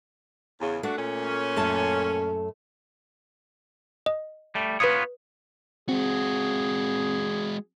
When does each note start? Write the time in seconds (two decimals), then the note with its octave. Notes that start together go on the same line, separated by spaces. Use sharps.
0.60 E2 C#3
0.83 A3 D4 F#4
0.97 A#2 C#4
1.56 F#2 A3 A5
4.06 D#5
4.55 G3 A3
4.80 B3 F4 B4 C#5 D#6
5.89 G#3 C4 F#4 G#4